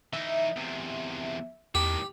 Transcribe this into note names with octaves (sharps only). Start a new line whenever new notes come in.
E3 D#4 E5
E2 C3
E2 A2 D#3 G4